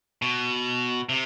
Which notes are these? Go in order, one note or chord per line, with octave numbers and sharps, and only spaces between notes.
B2
C3